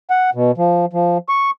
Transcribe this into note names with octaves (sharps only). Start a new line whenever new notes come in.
F#5
B2
F3
F3
C#6